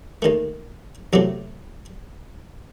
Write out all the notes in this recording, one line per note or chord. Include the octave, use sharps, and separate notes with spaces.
D#2 D#3 A3
E2 C3 F#3 A3